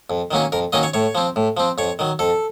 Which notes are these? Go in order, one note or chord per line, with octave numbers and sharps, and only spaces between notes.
F2
D#3 F#3 A#3 C#4
F2 A#4
D#3 F#3 A#3 C#4 D#5
C#5
A2 C#5
F3 C4
A2
F3 C4
F2 C#5
D#3 F#3
F2 A4